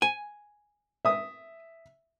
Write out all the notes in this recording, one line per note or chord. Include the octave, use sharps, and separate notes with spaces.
G#5
E5 D#6